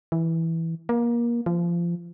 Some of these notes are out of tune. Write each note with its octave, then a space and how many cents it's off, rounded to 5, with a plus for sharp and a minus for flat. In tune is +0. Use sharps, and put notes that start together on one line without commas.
E3 -5
A#3 +25
F3 -25